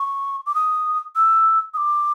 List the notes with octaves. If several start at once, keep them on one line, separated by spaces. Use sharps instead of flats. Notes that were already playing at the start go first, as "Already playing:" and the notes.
Already playing: C#6
D6
D#6
E6
D#6
D6